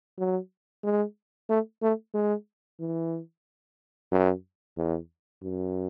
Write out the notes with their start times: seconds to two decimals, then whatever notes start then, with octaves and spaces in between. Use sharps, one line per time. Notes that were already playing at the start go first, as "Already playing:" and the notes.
0.18 F#3
0.83 G#3
1.49 A3
1.82 A3
2.14 G#3
2.80 E3
4.12 F#2
4.77 E2
5.43 F#2